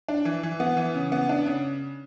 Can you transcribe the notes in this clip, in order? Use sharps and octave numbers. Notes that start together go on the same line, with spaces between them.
D4
E3
E3
B3
E3
C#3
B3
D4
C#3